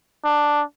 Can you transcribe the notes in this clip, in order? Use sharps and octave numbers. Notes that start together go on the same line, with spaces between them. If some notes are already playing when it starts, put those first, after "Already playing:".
D4